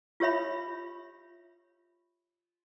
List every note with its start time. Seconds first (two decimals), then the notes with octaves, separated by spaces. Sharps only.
0.20 F4 G4 C#5 E5 B5